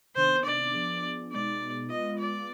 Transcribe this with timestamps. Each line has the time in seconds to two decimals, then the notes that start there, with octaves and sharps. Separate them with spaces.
0.16 C3 D#3 B3 D4 C5
0.45 D5
0.73 F3 B3 D4 G#4
1.31 B2 G#3 B3 D#4 D5
1.89 G#3 B3 F4 B4 D#5
2.18 D5